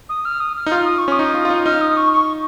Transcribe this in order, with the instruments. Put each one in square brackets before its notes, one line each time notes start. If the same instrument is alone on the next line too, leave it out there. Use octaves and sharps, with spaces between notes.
[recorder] D#6
F6
D#6
F6
[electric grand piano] D#4
[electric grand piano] F4 [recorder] F6
[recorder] D#6
C#6
[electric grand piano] C#4 [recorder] D#6
[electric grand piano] D#4
F4
F4
D#4
[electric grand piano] D#4 [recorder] F6
[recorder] D#6
C#6
C#6